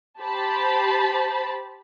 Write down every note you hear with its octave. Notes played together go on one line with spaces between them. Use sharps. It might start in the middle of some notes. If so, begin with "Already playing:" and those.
G4 C5 A5 B5